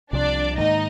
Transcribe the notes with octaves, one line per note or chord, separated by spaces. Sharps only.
C2 C3 F3 D4 D5
G#2 D#3 A#3 D#4 D#5